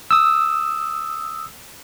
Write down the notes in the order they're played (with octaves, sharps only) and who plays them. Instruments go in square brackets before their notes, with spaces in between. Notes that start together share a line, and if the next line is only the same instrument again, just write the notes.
[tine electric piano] D#6 E6